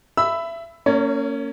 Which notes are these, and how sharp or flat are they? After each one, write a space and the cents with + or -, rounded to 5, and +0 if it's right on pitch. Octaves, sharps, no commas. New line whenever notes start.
E5 +25 B5 +15 E6 +0
A#3 -30 C#4 +0 C#5 +40